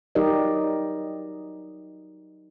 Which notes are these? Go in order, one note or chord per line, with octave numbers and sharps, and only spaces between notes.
F#3 D#4 G4 A#4 D5 D#5